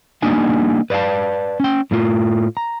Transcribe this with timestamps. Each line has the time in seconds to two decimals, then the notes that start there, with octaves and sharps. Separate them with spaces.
0.22 G3 A#3 D4 D#4 D#5 G#5
0.90 B4 D5 D#5 F5 A5
1.60 C#4 G5
1.91 A2 A3 F4
2.57 A#5